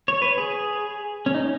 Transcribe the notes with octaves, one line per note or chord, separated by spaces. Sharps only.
C#5
B4
G#4
C#4
D#4